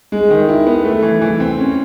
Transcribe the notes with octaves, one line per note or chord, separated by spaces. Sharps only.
G#3
D#3
E4
B3
A3
E3
E3
C4
C#4